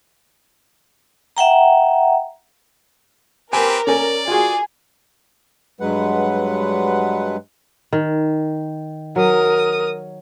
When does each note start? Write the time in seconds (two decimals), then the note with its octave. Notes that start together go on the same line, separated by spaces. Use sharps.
1.37 E5 F#5 G5 A#5
3.53 C4 G4 A#4 B4 G#5
3.87 C#4 A4 D5 G#5
4.28 F4 F#4 G#4
5.81 G2 F#3 G#3 B4 F#5
7.93 D#3
9.16 F#3 A#4 D#6